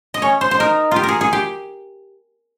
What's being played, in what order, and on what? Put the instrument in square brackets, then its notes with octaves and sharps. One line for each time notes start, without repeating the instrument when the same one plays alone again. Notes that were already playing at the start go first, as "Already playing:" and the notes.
[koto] D#5
[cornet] C#4 [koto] C#5
[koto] C5
C5
[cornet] D#4 [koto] A#4
[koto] F4 G4
A#4
G#4
G#4
G4